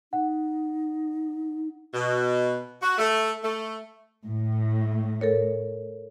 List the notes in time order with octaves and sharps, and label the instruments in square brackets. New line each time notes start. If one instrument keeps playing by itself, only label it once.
[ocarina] D#4 [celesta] F#5
[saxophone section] B2
F#4
A3
A3
[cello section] A2
[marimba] A4 A#4 C#5